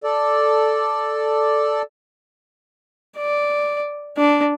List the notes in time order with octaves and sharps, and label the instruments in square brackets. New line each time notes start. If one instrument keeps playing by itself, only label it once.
[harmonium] A4 D5
[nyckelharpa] D5
D4